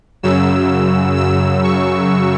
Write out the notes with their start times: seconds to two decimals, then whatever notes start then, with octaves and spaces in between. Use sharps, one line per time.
0.23 F#2 C#3 F#3 E6
1.16 E6
1.64 C#6